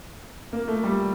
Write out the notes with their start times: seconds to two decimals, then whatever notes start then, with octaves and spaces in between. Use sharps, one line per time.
0.53 A#3
0.68 A3
0.84 G3